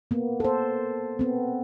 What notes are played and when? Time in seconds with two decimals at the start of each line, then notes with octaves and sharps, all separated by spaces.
0.11 A#3 B3
0.40 A4 C5
1.19 B3 C4